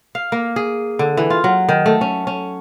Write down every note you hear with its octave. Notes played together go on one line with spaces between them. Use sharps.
F5
A#3
G#4
D3
E3
F4
F#3
D#3
A3
C#4
C#4